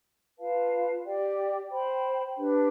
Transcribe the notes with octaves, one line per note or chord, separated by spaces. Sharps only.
F4 B4 F5 A5
G4 D5 G5
C5 G5 B5
D4 G4 B4